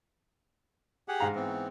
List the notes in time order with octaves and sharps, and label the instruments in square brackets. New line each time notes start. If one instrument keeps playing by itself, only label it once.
[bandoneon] G4 G#4 F#5
[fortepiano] G#2 F5 A#5
[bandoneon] E3 B3 C4